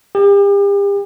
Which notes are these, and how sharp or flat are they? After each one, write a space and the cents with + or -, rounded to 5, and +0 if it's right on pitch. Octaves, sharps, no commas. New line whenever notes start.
G4 +40